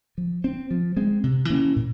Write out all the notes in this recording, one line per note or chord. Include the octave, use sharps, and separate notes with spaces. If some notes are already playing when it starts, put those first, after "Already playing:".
F3
C4
F3
G#3 C4
C3
E3 A#3 C#4
A#2